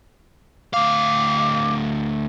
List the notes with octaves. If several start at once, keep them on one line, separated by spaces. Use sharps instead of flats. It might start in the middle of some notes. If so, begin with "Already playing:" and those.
D2 F5 D6